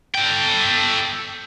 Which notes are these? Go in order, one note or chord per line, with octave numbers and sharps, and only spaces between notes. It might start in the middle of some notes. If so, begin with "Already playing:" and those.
A4 G5